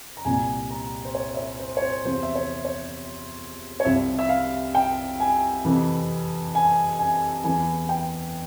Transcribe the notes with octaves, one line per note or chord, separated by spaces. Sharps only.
A#5
C2 A#2 F3 G#5
A#5
C5
C#5
E5
C#5
C5
C#5
C5
E2 C3 F3 C5
E5
C#5
C#5
C#5
C2 C3 F3 E5
E5
F5
G5
G#5
F2 C3 E3
G#5
G#5
E2 E3 G#5
G5